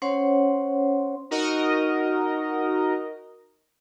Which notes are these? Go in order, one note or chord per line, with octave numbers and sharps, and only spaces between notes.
C#4 C5 C#5 F#5 C6
D#4 F#4 A#4 D#5